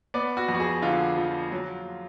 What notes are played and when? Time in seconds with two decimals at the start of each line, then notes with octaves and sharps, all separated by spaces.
0.14 B3 D5
0.37 F#4
0.48 F2
0.55 F#4
0.60 G#4
0.82 D3 F4
1.17 F3
1.52 F#3